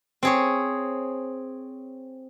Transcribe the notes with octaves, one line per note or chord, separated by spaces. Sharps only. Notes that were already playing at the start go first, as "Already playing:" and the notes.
C4 G#4 C#5